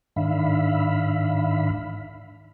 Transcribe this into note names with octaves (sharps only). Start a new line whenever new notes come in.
G#2 D#3 D4 E5 F5 B5